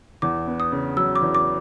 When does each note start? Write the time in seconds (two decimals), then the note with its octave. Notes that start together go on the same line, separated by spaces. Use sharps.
0.22 E2 D6
0.47 B3
0.60 D#6
0.72 C#3
0.97 F#3 E6
1.15 D6
1.22 E2
1.35 D6